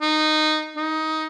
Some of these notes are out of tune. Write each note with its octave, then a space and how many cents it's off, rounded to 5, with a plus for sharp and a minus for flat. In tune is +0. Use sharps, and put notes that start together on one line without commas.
D#4 -15
D#4 +15